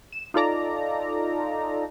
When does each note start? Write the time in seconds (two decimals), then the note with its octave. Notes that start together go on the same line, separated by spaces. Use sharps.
0.12 E7
0.34 D#4 F4 A4 D5 A#5